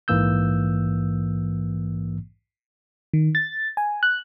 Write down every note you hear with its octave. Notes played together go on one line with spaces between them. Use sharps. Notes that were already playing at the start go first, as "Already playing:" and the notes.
A#1 G#2 E3 A#3 E6 G6
D#3
A6
G#5
F#6